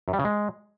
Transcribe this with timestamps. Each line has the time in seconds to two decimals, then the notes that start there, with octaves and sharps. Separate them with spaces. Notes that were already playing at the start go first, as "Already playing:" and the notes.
0.08 F#2
0.13 G3
0.19 C#3
0.25 G#3